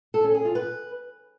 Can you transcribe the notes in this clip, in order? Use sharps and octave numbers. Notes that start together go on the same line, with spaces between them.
A4
C#4
G#4
F4
B4